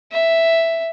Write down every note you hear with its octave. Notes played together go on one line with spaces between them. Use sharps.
E5